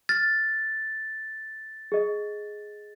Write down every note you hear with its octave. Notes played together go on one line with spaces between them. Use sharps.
F6 A6
G#4 D#5